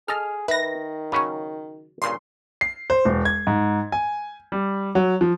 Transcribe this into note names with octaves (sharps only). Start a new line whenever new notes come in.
G#4 A4 D#5 F6
D#3 B4 E5 A#6
C#3 F#3 C#4 B5 C#6
G2 A#2 C#3 C6
C7
C5
E1
G#6
G#2
G#5
G3
F#3
F3